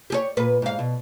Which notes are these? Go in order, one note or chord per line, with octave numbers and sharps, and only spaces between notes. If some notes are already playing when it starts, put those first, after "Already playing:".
G4 G#4 C#5
A#2 B4
G#2 F5
B2